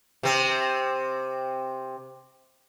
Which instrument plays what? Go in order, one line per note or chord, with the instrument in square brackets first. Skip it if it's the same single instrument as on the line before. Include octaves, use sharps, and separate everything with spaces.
[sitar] C3 C4